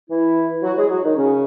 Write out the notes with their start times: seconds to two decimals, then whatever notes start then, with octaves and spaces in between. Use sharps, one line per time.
0.09 E3 E4
0.63 F#3 F#4
0.76 G#3 G#4
0.89 F#3 F#4
1.03 D#3 D#4
1.16 C#3 C#4